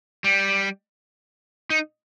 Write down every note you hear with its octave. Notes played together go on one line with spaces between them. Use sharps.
G3
D#4